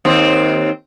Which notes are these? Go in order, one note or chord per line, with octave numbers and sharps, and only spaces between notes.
D#2 C4